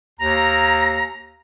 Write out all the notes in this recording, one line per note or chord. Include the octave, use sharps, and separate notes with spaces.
D#2 A#5